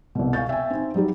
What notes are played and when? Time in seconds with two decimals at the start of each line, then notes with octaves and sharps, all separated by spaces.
0.15 C2 B2
0.33 F5 G#5 C#6 G6 A6
0.49 E5 G5 G#5
0.70 C4 D#4
0.94 F#3 G3 D#4 G4